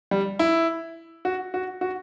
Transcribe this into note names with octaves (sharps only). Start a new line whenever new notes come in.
G3
E4
F#4
F#4
F#4